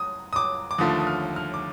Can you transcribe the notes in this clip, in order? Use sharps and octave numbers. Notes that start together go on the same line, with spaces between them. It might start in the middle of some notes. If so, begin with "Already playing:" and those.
Already playing: D#6
D#6
D6
D6
D#2 D3 F3 A3 D#6
D#6
F6
F6
D6